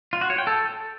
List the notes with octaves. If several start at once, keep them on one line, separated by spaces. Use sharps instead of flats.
F4
F#4
C#5
G5
A4